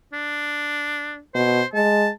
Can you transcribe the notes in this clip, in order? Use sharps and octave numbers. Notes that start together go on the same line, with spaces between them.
D4
B2 C5
G#3 A5